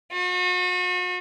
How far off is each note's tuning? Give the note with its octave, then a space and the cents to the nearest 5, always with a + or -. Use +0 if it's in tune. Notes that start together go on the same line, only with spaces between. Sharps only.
F#4 -40